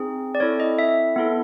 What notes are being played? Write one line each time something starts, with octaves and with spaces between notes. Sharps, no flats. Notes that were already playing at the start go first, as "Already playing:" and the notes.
Already playing: C4 D#4 G#4
D5
C4 E4 A4 C#5
D#5
E5
B3 E4 A4